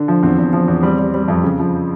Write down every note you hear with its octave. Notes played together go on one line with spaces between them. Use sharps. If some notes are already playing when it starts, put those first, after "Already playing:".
Already playing: D3
F3
E2 C4
E2
F3
E2
G3 C4
G3
G3
F2
C#3
F3